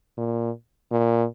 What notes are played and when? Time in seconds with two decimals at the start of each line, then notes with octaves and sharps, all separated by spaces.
0.17 A#2
0.91 A#2